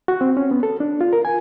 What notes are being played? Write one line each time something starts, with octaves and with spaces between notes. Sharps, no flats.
F#4
C4
C#4
B3
A4
D4
F4
A#4
G#5